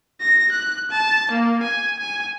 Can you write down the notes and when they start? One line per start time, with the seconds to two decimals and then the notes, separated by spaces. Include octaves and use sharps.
0.21 A#6
0.52 F#6
0.91 A5
1.31 A#3
1.63 G#5
1.99 G#5